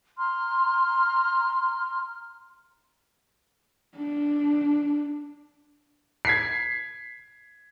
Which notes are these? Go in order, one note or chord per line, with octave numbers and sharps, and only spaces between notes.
A#5 C6 F6
D4
G#6 B6 C7